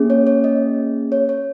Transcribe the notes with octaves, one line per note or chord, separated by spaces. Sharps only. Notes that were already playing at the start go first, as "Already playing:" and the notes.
Already playing: A#3 C#4 G#4
C#5
C#5
D#5
C#5
C#5